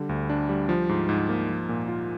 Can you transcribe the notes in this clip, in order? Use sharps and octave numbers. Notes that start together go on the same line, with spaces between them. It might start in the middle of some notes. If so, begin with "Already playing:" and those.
Already playing: D3 G3
D2
D4
G3
F3
G#2
G#2
A#3
F3
A#2
F4